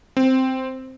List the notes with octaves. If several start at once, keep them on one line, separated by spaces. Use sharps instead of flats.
C4